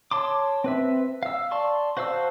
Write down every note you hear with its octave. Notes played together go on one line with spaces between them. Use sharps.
C#5 A5 C6 D6
C4 B4 E5
F5 E6
D5 A5 C6 C#6
F#4 C5 F5 A5 E6